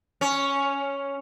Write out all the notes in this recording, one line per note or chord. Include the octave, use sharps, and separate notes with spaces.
C#4